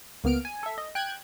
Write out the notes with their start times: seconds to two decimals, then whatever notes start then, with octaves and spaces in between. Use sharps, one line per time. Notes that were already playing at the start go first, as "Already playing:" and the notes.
0.24 C#2 A#3 B3 F6 D7
0.45 G#5
0.63 A4 E5
0.78 D#5
0.95 G5 F#6 G#6